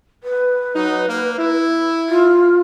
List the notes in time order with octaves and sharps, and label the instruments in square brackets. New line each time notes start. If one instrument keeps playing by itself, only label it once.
[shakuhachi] B4
[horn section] F#3 D#4
A#3
E4
[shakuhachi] F4